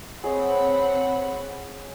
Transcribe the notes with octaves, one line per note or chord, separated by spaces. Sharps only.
C4 G#4 C#5 D#5 F#5 B5